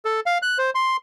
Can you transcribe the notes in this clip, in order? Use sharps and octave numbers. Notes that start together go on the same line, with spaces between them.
A4
F5
F#6
C5
C6